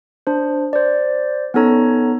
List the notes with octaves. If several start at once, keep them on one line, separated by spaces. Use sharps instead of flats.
D4 C5
C5 D5
B3 C#4 D#4 A4 C#5 A#5